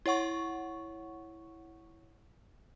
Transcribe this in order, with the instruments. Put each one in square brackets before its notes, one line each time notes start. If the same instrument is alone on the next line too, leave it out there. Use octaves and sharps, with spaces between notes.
[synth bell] E4 C#5 F#5 C#6